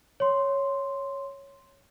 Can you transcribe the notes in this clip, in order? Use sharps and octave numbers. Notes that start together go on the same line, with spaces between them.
C#5 C6